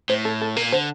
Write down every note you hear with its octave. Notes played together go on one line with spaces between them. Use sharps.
A2 C5
A4
A4
A#2 A#4
D3 C5